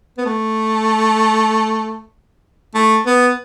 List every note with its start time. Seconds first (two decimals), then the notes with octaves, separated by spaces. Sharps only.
0.18 B3
0.26 A3
2.75 A3
3.06 B3